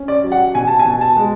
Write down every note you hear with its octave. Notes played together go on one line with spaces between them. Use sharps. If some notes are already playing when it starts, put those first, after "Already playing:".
Already playing: C#4
D5
F#3
F#5
B2 G#5
A5
G#5
B2
A5
G#3